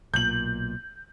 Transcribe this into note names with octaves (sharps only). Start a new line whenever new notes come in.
B1 A#2 G6 F#7